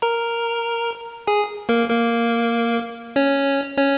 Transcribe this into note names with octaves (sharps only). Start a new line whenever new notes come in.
A#4 A#5
G#4 G#5
A#3 A#4
A#3 A#4
C#4 C#5
C#4 C#5